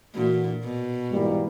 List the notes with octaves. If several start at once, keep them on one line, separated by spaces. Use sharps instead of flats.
A#2 E3 A3 D4 F#4
B2
G#2 E3 G3 A#3